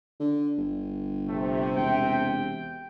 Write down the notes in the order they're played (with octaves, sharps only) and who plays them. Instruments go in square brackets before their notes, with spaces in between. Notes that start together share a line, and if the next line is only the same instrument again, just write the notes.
[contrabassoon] D3
G1
[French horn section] C3 [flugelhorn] A3
[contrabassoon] E1 [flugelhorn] G5
[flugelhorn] G5